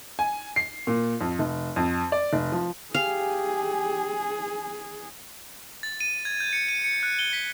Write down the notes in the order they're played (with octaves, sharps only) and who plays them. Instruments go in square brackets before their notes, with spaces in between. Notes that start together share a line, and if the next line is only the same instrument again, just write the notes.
[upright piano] G#5
C7
A#2
F2
F1
F2
D5
F1
F3
[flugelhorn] G4 [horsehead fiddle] G#4 [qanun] F5 [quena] G#5
[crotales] A6
D#7
G#6
G6
C#7
D#7
C#7
F#6
G7
B6